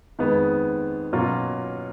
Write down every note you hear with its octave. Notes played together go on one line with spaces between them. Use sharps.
F2 D#3 G#3 B3
B2 F#3 A#3 C#4 F4